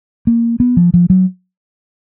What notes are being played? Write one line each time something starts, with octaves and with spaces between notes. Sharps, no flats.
A#3
B3
F3
F3
F#3